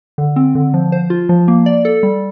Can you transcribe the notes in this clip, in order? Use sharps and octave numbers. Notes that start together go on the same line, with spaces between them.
D3
C4
D3
F3
C5
F4
F3
A#3
D5
A4
G3